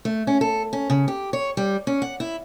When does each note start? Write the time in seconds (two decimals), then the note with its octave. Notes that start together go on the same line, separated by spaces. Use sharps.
0.05 A3
0.27 C#4
0.41 A4
0.73 C#4
0.90 C#3
1.08 G4
1.33 C#5
1.57 G3
1.87 C#4
2.02 F#5
2.20 E4